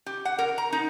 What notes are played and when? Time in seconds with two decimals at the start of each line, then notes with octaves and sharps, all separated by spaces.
0.06 G4
0.25 F#5
0.38 A#4
0.58 A#5
0.72 D#4